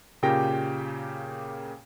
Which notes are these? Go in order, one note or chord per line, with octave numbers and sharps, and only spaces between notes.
A#2 C#3 A#3 G4 G5 A#6